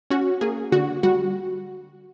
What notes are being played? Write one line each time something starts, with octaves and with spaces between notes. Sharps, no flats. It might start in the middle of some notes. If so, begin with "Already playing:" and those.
C#4 F#4
A#3 G#4
D3 F#4
G3 F#4